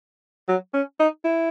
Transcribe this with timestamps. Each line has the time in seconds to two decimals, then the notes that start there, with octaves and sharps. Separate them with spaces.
0.48 F#3
0.74 C#4
1.00 D#4
1.24 E4